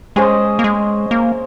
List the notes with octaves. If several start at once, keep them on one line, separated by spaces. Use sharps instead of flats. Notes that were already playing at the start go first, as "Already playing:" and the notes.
G#3 C#4 G#4 C5 D#5
A#3
G#3
A#3